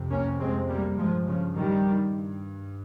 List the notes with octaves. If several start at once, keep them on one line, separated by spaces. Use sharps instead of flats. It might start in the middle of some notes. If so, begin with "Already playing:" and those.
Already playing: F2 C3
A#3 C#4
G#3 C4
G3 A#3
G2 F3 G#3
C#3 F3
D#3 G3
G2